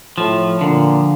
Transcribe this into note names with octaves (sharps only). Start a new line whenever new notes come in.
A2 F3
A#2 D3